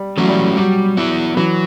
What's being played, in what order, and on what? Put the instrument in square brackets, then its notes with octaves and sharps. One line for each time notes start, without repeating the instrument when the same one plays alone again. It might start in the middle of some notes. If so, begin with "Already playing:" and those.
Already playing: [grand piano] G3
[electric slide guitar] E3 A3 C#4 [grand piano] F#3
[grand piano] G3
F#3
[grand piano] F#3 [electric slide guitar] G3
[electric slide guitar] B3 E4
[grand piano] E3 [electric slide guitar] F#3